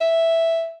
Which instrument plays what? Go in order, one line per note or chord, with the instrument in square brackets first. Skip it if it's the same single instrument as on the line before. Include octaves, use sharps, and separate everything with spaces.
[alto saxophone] E5